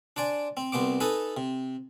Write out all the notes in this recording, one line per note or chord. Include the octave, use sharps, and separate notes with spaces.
D4 C5 D5 G#5
C4
C2 C3 B3 C5 D6
D#4 A4 B4 G#5 B5
C3